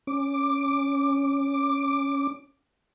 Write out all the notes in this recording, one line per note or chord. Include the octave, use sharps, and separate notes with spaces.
C#4 D6